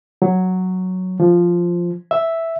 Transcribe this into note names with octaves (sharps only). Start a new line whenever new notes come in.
F#3
F3
E5